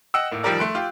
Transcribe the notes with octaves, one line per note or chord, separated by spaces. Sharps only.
D#5 F#5 G5 E6
A2 A#3
D#3 F3 G3 G4 A#4 D5
A3 C6 F#6 D7
F4 G4